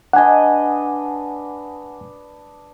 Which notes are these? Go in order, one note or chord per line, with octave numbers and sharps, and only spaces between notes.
D4 B4 D#5 F#5 G#5